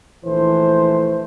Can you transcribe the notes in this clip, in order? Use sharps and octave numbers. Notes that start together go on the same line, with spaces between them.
A#1 E3 A3 C5